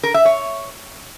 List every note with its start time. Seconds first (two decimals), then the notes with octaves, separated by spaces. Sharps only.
0.03 A#4
0.14 E5
0.25 C#5